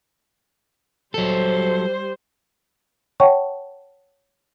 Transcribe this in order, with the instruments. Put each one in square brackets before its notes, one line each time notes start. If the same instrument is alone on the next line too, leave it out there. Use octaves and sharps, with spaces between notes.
[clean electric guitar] F#3 A4 [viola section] G3 C5
[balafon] C#5 F#5 G5 A5 C#6